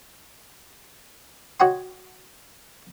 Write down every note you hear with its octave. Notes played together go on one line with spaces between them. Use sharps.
F#4 C#5 D#5 F#5 G5 C6